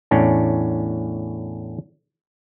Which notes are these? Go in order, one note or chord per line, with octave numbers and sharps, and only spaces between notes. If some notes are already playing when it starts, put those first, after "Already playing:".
E2 A2 C#4 D4